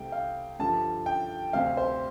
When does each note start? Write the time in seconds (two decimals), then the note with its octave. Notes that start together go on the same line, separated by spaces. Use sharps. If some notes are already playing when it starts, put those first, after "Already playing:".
Already playing: C2 C3 A3 G5
0.12 F5
0.59 G2 D3 F3 A5
1.06 G5
1.53 D2 C3 G3 C4 F5
1.77 C5